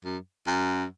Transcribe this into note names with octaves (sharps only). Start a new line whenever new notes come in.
F#2
F#2